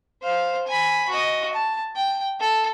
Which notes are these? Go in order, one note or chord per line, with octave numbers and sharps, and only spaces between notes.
C5 F5
G#5 B5
F#4 D#5
A5
G5
A4